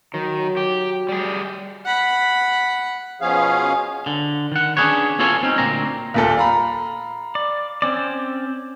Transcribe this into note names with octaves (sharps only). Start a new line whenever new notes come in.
D#3 F#3
G4
G3 G#4
F#5 B5
B2 F3 C#4 G#4 F5
D3
D#3 F#5
C#4 D4 E4 G#4 B4 C#5
B3 E4 F4 A4 C#5 G#5
C4 C#4 D#4
D2 A#2 C4 A#5
D#1 A#2 A4
F5 A#5 B5
D5
C4 C#4 D5